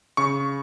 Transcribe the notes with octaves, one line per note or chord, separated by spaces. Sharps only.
C#3 C#6